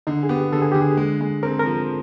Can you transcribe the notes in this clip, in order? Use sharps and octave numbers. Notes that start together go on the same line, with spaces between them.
D3 D#4
G#4
B3 G4
D3 A4
G#4
D3 G4
G#4
G#3
G#3
C4 A#4
A4
A#4
F3